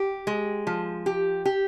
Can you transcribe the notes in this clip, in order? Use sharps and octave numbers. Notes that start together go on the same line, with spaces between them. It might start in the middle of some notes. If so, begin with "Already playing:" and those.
Already playing: G4
G#3
F3
G4
G4